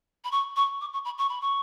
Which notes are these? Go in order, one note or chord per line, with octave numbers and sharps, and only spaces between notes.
B5
C#6
C#6
D6
C#6
B5
C#6
B5
C#6